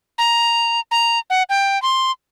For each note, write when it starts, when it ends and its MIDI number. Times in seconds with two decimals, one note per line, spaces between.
0.18 0.80 82
0.91 1.19 82
1.30 1.43 78
1.49 1.81 79
1.82 2.11 84